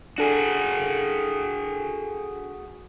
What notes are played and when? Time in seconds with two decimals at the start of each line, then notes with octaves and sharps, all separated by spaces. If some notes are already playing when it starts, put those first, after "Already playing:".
0.18 D4 F#4 G#4 A4